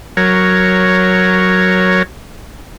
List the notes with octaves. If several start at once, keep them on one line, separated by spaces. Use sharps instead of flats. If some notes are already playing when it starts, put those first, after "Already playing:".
F#3 A#4 C#5